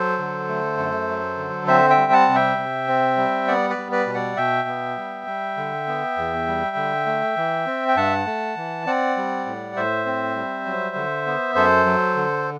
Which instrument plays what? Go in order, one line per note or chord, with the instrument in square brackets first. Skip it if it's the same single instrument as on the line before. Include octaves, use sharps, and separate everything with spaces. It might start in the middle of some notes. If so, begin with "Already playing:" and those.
Already playing: [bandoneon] F#3 A4 C5
D3
A3
F#2
F#3
D3
C4 C5 E5
E5 G5
G3
F#5 A5
C3
E5 G5
C3
C4
G3
B3 D5 F#5
B4 D5
G3
B4 D5
B2
D5 F#5
B2 E5 G5
B3
G3
G3
D3
B3
E2
G3
D3
A3
E3
C4
G5
G2 F#5 A5
A3
E3
C4 D5 F#5
G3
A2
A2 C5 E5
C4
G3
F#3
D3
B3
F#2 A4 C5
F#3
D3